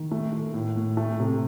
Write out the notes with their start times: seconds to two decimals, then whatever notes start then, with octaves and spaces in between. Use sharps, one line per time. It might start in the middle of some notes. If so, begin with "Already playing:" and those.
Already playing: D#3
0.11 A3
0.33 A3
0.54 A2
0.76 A2
0.97 A3
1.20 C3